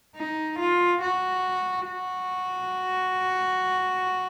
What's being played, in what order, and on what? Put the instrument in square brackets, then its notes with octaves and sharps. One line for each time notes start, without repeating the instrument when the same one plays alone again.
[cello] D#4
F4
F#4
F#4